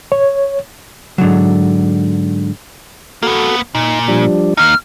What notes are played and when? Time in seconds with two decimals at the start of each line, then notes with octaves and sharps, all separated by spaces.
0.12 C#5
1.18 G#2 D3 E3 F#3
3.23 A#3 B3 F#4 A4
3.75 A#2 D#4
4.08 F3 G3 D4
4.57 A#3 D#4 F6